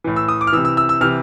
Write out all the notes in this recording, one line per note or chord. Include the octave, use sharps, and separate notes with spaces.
A2 E3
E6
D#6
D6
F6
C3 E3 E6
E6
E6
E6
C3 E3 F6